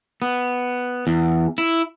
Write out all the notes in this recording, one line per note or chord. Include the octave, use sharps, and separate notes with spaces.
B3
E2
E4